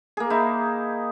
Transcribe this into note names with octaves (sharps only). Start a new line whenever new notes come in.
A#3 G#4
D#4 E4